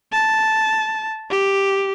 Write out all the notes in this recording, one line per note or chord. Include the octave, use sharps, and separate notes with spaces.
A5
G4